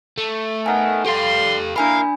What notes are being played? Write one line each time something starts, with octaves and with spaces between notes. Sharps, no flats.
A3
B3 D#4 A#4 F#5 G#5
G3 G4 A4 F5 C6
A#3 D4 E4 A#4 F5 G#5 B5